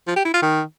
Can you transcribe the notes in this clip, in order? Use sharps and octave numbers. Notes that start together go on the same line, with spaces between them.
F3
G4
E4
F4
D#3